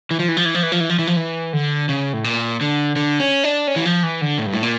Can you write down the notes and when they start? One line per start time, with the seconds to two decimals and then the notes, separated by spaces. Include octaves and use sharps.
0.11 E3
0.19 F3
0.28 E3
0.37 F3
0.45 E3
0.55 F3
0.63 E3
0.72 F3
0.80 E3
0.89 F3
0.99 E3
1.07 F3
1.16 E3
1.53 D3
1.89 C#3
2.13 A2
2.24 A#2
2.61 D3
2.96 D3
3.20 C#4
3.44 D4
3.67 C#4
3.76 E3
3.85 F3
4.03 E3
4.21 D3
4.38 A2
4.46 G2
4.54 A2
4.63 A#2